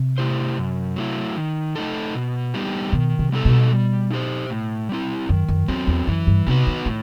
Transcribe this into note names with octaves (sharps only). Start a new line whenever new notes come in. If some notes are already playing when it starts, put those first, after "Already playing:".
Already playing: C3
A3 E4 G4 C5
F#2
F#3 A3 E4
D#3
A3 D#4 A4
B2
G3 B3 D#4 G4
B2 D#3
C3
G3 B3 D#4 A4
B2
G3
D#4 G4 C5
A2
G3 C4 E4
F#2 D#3
F#2
E2 F#3 C4
E2
F#2 E3
G2
C3 B3 D#4 F#4 B4
D#3
A2 D#3